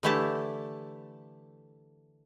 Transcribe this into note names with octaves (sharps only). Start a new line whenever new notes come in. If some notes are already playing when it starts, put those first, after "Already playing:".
D3 E3 A3 E4 G4 A5